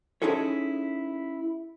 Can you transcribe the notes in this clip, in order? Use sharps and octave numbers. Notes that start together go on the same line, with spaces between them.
C#4 D#4 E4 G#4 A4 C#5